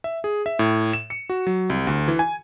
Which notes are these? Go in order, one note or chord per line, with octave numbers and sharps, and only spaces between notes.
E5
G#4
E5
A2
E7
C#7
F#4
F#3
C2
D2
E3
G#5